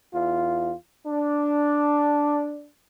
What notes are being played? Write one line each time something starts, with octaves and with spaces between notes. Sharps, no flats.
E2 F4
D4